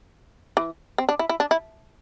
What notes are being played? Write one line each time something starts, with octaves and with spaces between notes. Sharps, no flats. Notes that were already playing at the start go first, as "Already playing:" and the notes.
E3
C4
D4
E4
E4
D4
E4